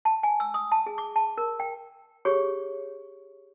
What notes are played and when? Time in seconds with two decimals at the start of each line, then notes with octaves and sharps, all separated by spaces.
0.05 A5
0.23 G#5
0.40 E6
0.54 D#6
0.72 A5
0.86 G#4
0.98 D6
1.16 A5
1.38 A#4
1.60 G5
2.25 G4 G#4 C#5 C#6